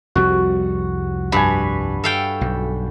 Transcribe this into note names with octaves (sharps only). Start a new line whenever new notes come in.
C2 F2 G3 F#4
G2 G#5 A5 B5
A4 F5 G5
B1